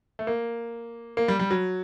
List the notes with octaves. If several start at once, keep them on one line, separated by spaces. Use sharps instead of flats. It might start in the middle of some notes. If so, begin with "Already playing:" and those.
A3
A#3
A#3
G3
G3
F#3